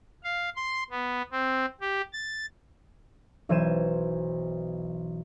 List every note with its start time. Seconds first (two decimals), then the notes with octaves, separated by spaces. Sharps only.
0.24 F5
0.56 C6
0.90 B3
1.32 C4
1.81 G4
2.13 A6
3.49 B1 E3 C5 G#6 D#7 E7